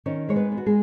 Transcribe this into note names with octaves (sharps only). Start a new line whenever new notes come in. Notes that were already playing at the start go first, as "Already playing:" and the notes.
D#3 C#4 C#5
G#3 C#5
B3 B4
B3
F#4
G#3 G#4